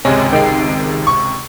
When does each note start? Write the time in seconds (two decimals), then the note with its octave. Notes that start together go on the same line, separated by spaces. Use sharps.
0.05 G#1 C#2 C3 G#3 C#4
0.33 D#3 G#3 G5 C7
1.07 C#6